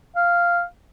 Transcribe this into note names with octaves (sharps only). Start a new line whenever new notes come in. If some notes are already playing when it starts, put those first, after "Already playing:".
F5